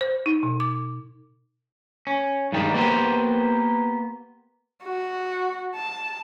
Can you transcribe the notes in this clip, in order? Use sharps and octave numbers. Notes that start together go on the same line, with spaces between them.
C5
D#4
B2
D6
C#4
G2 D#3 G3 G#3
A#3 B3 G4 C5
F#4
A5